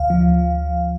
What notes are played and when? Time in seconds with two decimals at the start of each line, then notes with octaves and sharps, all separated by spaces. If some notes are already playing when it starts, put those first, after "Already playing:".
Already playing: D2 F5
0.10 F3